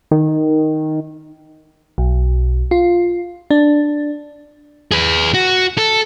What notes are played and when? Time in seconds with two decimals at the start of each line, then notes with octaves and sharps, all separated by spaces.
0.11 D#3
1.98 B1
2.71 F4
3.51 D4
4.92 G#4 B4
5.34 F#4
5.78 A4